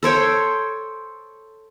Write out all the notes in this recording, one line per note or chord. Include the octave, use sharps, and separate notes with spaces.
A4 C5 C#5 G5